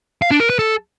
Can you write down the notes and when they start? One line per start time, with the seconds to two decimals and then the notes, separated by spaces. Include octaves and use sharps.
0.22 F5
0.31 D4
0.40 A#4
0.50 B4
0.59 A4